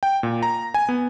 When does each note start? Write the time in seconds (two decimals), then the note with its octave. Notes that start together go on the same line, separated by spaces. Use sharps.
0.03 G5
0.23 A#2
0.43 A#5
0.74 G#5
0.89 B3